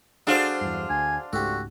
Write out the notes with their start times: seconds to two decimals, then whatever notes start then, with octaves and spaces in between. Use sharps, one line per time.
0.27 F#3 D4 F4 G#4 A4 C5
0.61 E2 G2
0.90 D2 G#5
1.33 C#2 G#2 A3 F#4 G4 A4